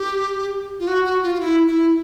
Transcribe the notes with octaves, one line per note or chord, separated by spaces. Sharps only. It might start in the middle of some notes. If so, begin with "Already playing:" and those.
Already playing: G4
F4
F#4
F#4
F4
F4
E4
E4